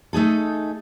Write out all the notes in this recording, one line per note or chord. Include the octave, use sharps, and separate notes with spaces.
A3 D#4 G#4 A4